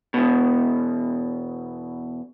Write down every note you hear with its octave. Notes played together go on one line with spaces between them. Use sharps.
E2 B2